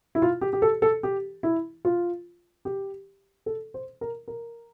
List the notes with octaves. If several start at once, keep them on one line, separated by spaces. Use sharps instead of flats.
E4
F4
G4
G4
A4
A4
G4
E4
F4
G4
A4
C5
A#4
A#4